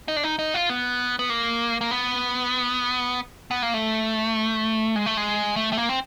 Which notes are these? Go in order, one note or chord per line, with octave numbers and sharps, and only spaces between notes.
D#4
D4
D#4
D#4
F4
B3
B3
A#3
A#3
B3
B3
A#3
A3
G#3
A3
G#3
A3
A3
A#3
C4